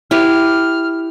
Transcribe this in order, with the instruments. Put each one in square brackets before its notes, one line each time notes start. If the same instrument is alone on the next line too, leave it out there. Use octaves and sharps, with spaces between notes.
[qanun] E4 G4 B4 [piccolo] F6